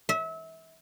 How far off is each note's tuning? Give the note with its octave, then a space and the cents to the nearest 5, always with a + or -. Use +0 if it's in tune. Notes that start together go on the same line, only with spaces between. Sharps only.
E5 -30